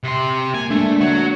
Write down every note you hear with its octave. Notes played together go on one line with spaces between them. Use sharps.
C3 C6
A#3 G#5
G#3 A3 B3 D4
D3 F#4 C#5